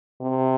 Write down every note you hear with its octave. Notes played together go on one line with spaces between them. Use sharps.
C3